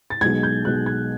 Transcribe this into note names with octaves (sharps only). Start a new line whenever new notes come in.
A6
B1 B2 G#3 G#6
G6
B1 B2 G#3 F#6
G#6